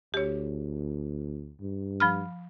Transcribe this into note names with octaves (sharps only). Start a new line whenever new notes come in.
D2 G4 C#5
G2
F3 B5 F6